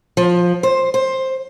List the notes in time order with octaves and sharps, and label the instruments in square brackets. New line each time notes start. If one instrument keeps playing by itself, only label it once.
[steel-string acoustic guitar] F3
C5
C5